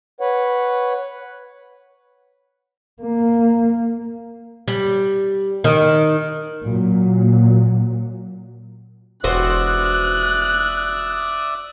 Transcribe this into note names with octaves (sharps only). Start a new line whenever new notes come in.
B4 C#5 F#5
A#3
G3
D#3
A#2 F#3
E1 F#4 B4 C5 D5 E5 D#6 F#6